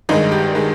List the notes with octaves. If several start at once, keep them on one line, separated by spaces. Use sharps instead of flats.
G#1 G2 D#3 G#3 D#4
G4
D#3 G#3